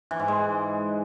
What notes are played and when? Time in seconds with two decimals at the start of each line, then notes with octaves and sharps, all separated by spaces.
0.11 E3
0.19 G#2
0.28 G#3